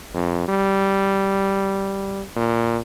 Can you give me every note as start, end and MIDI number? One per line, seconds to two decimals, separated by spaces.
0.14 0.46 41
0.48 2.22 55
2.36 2.78 46